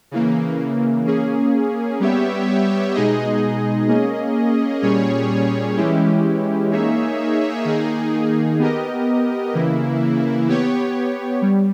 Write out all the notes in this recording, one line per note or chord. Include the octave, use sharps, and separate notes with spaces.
C#3 E3 A#3
A#3 C#4 G#4
G3 B3 G4 C#5 E5
B2 G#3 D#4 G#4 D#5
A#3 C#4 G#4 D#5
A#2 G3 C#4 G#4 C#5
E3 G#3 C#4 E4 G4
A#3 D#4 G#4 C#5 E5
D#3 A#3 D#4 G#4
B3 G4 A#4 D#5
C#3 E3 A#3 E4
B3 G4 C#5
G3